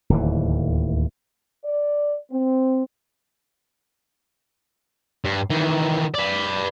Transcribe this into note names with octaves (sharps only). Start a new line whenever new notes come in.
D1 D#2 E3
D5
C4
G2
D#3 E3
B4 D5